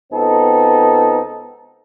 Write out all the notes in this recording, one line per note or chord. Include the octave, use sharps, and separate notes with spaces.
C#2 B3 C4 D#4 A4